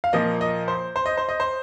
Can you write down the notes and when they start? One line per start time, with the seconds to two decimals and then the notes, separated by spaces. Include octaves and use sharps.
0.04 F5
0.13 A#2 F3 A#3 D#5
0.41 D#5
0.68 C5
0.96 C5
1.06 D#5
1.17 C5
1.29 D#5
1.40 C5